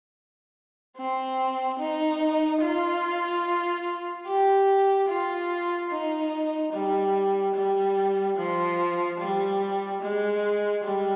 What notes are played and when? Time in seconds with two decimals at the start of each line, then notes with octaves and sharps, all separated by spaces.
0.97 C4
1.79 D#4
2.61 F4
4.27 G4
5.09 F4
5.90 D#4
6.73 G3
7.55 G3
8.37 F3
9.20 G3
10.02 G#3
10.84 G3